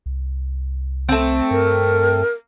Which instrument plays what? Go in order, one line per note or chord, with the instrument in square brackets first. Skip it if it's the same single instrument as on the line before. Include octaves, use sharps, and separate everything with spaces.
[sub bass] C2
[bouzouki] A3 C4
[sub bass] G2 [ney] A#4